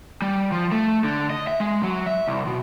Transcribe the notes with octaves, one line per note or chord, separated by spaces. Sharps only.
G3
F3
A3
D3
D#5
E5
G#3
F#3
E5
C2
B2